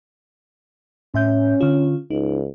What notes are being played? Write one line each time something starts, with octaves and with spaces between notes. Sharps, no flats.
A2 C#4 E5 G6
D3 F4
C#2 D#4